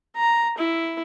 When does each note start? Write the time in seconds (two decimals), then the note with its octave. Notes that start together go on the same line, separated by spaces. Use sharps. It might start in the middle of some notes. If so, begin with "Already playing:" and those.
0.17 A#5
0.57 E4